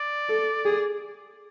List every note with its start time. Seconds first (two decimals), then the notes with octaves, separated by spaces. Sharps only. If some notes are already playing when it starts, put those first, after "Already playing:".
Already playing: D5
0.29 A4
0.65 G#4